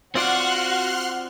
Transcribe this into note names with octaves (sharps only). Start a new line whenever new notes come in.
C4 F4 F#4 D5 F#5 C6 F6 F#6